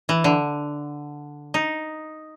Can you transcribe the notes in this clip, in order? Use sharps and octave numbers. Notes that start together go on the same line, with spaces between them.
E3
D3
D#4